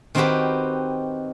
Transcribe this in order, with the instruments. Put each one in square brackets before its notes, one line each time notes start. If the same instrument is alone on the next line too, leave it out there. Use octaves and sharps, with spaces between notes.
[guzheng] D#3 C4 D#4 F#4 G4 B4